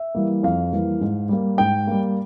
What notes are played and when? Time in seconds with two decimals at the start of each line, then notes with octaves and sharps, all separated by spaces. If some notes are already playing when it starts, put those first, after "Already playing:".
Already playing: E5
0.15 E3 G3 A#3
0.43 F2 F5
0.72 E3 G3 A#3
1.01 G#2
1.29 G3 A#3
1.58 G#2 G5
1.87 G3 A#3